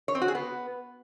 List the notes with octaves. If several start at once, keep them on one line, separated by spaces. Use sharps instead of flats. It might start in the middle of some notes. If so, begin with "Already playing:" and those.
C#5
C4
F#4
G#4
B3